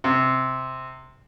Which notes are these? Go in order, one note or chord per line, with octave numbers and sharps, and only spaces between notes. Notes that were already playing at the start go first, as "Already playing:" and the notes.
C3